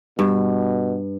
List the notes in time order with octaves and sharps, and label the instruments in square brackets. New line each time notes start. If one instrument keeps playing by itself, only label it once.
[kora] G2 [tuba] B2